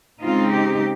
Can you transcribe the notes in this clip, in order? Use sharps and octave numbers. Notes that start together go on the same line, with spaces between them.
C#3 G#3 C4 D#4 F4
G4